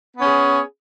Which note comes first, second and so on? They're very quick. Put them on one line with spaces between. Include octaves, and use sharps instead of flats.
B3 C#4 G#4